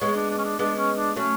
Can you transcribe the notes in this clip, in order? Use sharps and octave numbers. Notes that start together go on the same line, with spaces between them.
G#3 B3 C#5
D4
D4
C#4
D4
G#3 B3 D4
C#4
D4
F#3 A3 C#4